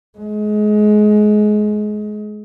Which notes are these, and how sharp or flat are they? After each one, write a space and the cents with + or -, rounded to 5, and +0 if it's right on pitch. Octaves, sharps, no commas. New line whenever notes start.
G#3 +25